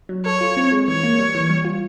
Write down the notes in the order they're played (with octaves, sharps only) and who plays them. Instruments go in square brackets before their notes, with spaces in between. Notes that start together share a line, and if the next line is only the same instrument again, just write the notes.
[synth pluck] F#3
[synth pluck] A4 [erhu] C#5
[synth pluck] F4
C4
G#3
[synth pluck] E3 [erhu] C#5
[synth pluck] A#3
G3
E3
G3
F4